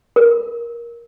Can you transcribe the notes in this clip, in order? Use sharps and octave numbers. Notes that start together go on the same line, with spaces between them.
A#4